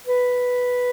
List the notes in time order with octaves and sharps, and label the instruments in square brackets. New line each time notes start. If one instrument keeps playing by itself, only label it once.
[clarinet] B4